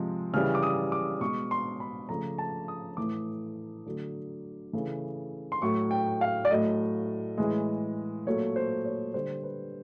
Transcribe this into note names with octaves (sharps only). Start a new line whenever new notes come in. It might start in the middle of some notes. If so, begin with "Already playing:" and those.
Already playing: C3 F3 G#3
C#3 E3 G3 F6
D6
D#6
D6
B2 G#3 C#6
C6
B5
C#3 F3 A3 A#5
A5
D#6
A2 E3 A3 D6
D3 F#3 A3
C#3 E3 A3
C6
A2 F#3 A3 C#6
G5
F5
D5
A2 F#3 A3 D#5
A2 E3 G#3
A#2 F#3 A3 C#5
C5
C#5
D3 G3 C5
B4